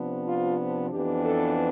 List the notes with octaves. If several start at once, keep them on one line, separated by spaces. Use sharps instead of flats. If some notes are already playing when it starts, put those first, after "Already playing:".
Already playing: C3 F3 B3 D4
F4
F2 E3 B3 D4 G4
A4